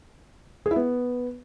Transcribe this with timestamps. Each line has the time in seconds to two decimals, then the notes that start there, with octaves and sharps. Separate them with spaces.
0.66 G#4
0.71 E4
0.76 B3